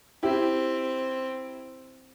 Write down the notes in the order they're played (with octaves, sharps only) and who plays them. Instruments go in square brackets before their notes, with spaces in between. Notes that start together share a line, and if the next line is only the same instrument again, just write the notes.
[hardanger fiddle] C4 [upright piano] E4 G4